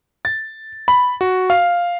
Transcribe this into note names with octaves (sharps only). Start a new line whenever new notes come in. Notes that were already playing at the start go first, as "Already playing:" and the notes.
A6
B5
F#4
F5